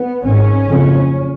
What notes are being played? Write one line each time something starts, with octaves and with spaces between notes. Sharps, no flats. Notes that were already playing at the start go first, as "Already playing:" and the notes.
Already playing: B3
G#1 G#2 C#4
F#1 F2 C#3